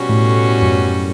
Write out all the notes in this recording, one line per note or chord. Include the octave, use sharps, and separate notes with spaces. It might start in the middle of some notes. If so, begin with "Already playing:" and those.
Already playing: B2 G3 C#4 F#4
A2
F#2